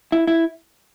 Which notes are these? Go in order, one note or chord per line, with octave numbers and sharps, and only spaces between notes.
E4
E4